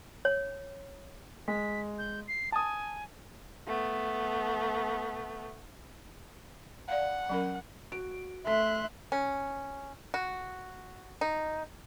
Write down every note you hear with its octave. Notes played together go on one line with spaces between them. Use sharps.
C#5
G#3 B6
G6
C7
G#5 A5 D#6
A3 B3
D5 F5 F#5
F#3 C#4 A#4
F#4 D7
A3 E5 C6 F#6 B6
C#4
F#4
D#4